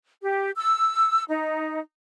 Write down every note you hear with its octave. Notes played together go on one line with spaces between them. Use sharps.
G4
E6
D#4